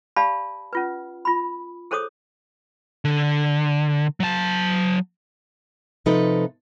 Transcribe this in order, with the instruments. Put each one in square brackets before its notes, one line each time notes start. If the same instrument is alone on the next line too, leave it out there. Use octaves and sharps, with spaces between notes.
[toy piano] G4 D5 F5 A5 B5
C#4 F4 B4
F4 B5
G#4 A4 C5 C#5 D6 D#6
[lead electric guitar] D3
F#3 A5
[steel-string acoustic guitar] C3 F3 D#4 A4 B4